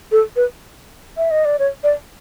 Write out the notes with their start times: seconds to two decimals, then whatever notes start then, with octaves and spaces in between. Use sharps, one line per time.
0.12 A4
0.36 B4
1.17 E5
1.31 D#5
1.45 D5
1.59 C#5
1.84 D5